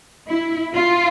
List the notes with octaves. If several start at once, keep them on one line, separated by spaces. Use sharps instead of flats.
E4
F4